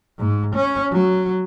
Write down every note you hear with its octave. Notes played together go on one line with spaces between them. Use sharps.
G#2
C#4
F#3